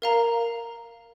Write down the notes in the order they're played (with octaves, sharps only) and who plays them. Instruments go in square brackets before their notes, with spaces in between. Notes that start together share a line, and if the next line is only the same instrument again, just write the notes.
[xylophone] A#4 F5 A#5